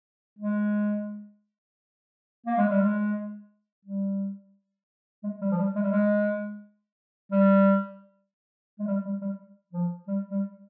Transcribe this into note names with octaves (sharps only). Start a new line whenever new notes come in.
G#3
A#3
G#3
G3
G#3
G3
G#3
G3
F3
G3
G#3
G3
G#3
G3
G#3
G3
G3
G3
F3
G3
G3